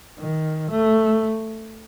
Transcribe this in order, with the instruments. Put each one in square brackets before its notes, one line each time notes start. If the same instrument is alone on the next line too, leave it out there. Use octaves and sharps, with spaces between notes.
[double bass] D#3
A3